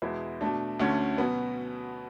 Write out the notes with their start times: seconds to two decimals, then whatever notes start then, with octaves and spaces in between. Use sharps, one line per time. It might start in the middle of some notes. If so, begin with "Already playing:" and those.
0.02 E2 B2 G#3 B3 E4
0.41 B2 A3 D4
0.80 D2 D3 A3 C#4
1.18 B2 F#3 B3